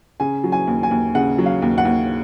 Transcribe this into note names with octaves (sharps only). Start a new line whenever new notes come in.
C#3 G#5
F#3
G#5
D#2
G#5
D#2
C#3 F#5
F#3
F5
D#2
F#5
D#2